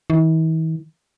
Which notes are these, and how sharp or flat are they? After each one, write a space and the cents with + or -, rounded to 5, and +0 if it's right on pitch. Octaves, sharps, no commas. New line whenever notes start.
E3 -45